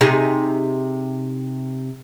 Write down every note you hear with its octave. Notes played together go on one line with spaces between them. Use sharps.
C3 D#4 G#4